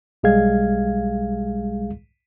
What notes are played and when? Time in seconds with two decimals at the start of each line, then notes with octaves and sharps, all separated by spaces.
0.23 B1 G3 G#3 G#4 F5 G#6